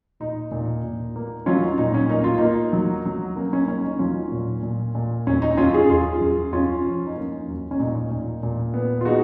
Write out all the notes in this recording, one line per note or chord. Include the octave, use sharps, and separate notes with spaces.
A#2 D#4
A#2
A#2
A#3
F#3 C#4 F4
D#4
A#2 D#4
C#4
A#3 D#4
F4
A#3 D#4
F#3
F#3
A#3 C#4
C#4
A#3 C#4
D#4
F#3 C#4 F4
A#2
A#2
A#2
F#2 C#4
D#4
F#2 C#4 F4
F4 G#4
F#2 F4 G#4
F#2
F#2 C#4 F4
F3
D#4
A#3 C#4
F#2
C#4
A#2 D#4
A#2
A#2
B3
F4
G#3 D#4 F#4